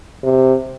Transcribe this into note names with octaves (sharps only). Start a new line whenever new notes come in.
C3